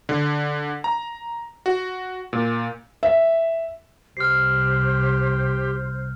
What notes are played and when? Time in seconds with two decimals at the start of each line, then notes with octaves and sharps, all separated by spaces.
0.09 D3
0.84 A#5
1.66 F#4
2.33 A#2
3.03 E5
4.17 C2 G4 C5 F6 C7